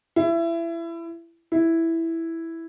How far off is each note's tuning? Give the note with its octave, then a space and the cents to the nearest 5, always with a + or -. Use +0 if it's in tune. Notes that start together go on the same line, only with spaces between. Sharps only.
E4 +25
E4 +0